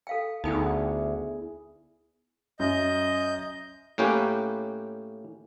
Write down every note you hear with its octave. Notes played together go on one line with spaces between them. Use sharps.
A4 F5 G5
D2 B3 D#4 E4 G#4 A4 G5
F#2 D#5 G6
A2 A#3 C#4 G4 B4